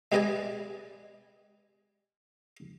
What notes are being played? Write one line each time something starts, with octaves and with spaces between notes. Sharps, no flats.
G#3 G4 B4 D5 D#5 G#5